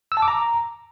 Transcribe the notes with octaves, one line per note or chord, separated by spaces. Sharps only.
E6
A5
D6
A#5